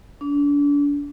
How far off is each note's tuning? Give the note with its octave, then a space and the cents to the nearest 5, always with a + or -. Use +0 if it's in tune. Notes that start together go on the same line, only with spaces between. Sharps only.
D4 -35